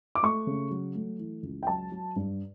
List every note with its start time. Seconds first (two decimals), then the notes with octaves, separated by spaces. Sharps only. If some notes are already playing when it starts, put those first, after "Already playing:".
0.15 D6
0.23 A3 C#6
0.47 C#3
0.71 F#3
0.95 A3
1.19 E3
1.43 C#2
1.63 G5
1.67 F#3 A5
1.92 F#3
2.16 G2